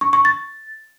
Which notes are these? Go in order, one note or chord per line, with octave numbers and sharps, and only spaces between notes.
C#6
C#6
A6